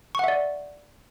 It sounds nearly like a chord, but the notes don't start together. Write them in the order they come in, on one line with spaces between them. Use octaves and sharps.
C#6 F#5 E5 D5